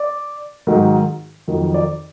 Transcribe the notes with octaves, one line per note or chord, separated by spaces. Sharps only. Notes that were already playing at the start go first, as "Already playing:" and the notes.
Already playing: D5
G#2 D#3 F#3
F2 D#3 F#3
D5